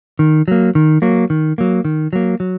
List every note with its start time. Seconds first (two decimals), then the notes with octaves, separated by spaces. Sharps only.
0.19 D#3
0.48 F#3 A#3
0.75 D#3
1.02 F#3 A#3
1.30 D#3
1.58 F#3 A#3
1.85 D#3
2.13 F#3 A#3
2.40 F#3